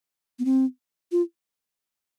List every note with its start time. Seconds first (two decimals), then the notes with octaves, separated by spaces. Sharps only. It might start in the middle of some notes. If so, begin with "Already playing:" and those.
0.39 B3
0.45 C4
1.12 F4